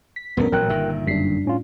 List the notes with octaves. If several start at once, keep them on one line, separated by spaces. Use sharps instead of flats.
B6
E1 D2 G2 B3 C#4 A#4
A1 A#2 F#3 A#4 G5 F#6
G1 A#2 D#3 E5
F#2 G3 D4 B6 C7
A2 C#4 F4